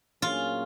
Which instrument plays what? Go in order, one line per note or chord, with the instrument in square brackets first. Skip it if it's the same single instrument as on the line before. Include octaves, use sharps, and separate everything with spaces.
[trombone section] A#2 F#3 A#3 C#4 G#4 [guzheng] F4